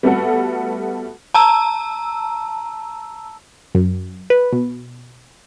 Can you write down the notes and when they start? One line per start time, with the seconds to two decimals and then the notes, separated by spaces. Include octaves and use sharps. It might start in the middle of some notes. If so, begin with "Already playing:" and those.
0.03 G3 A3 B3 F#4 A4
1.34 A5 A#5 E6
3.75 F#2
4.30 B4
4.52 B2